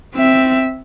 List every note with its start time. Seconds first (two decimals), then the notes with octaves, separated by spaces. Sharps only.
0.15 C4 E5